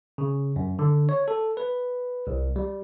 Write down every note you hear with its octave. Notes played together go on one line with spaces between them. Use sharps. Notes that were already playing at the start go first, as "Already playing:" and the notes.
C#3
F#2
D3
C#5
A4
B4
C2
G3